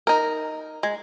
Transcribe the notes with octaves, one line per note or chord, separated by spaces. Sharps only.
D#4 A#4
G#3